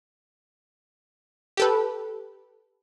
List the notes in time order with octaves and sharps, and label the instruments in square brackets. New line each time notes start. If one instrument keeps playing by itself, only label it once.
[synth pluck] G4 A4 B4